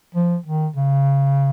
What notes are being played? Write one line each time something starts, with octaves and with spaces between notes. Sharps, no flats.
F3
D#3
C#3